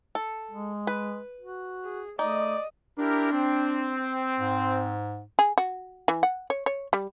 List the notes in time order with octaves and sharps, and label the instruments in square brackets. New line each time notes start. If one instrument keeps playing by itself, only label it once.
[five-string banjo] A4
[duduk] G#3
[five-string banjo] B4
[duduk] F#4
[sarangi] G#4
[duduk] A3 [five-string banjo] D#4 [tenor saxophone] D5 [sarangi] D#5
[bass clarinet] D4 [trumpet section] E4 G4 A#4
[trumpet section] C4
[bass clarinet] G#2
[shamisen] G#4
F#4
E3
F#5
C#5
C#5
G3